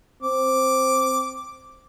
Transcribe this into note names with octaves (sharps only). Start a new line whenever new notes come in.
C4 D6